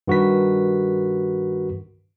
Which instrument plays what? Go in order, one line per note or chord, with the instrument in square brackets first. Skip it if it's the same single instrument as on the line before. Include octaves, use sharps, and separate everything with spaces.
[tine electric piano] G2 D#3 F#4 A#4 B4 B6